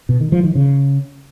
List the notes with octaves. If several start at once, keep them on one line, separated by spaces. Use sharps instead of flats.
B2
D#3
F3
D#3
C#3